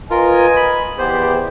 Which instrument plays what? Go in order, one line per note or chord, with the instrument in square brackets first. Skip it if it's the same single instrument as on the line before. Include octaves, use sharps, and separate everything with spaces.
[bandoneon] F4 A#4 [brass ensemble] B4 D#5 G#5
[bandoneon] B5
[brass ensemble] E2 G4 D5 [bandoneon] B3 C5